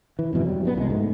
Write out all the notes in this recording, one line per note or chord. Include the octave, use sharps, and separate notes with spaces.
E3
F2 G#2 B2 E3
F#3 G3
F#2 G#3 B3
C2 F3 G#3
G#2 A3